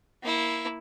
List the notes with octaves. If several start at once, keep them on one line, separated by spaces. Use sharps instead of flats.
A#3 E4